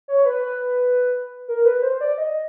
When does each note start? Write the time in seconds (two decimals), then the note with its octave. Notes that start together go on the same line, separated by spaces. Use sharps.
0.08 C#5
0.25 B4
0.43 B4
1.48 A#4
1.65 B4
1.82 C5
2.01 D5
2.18 D#5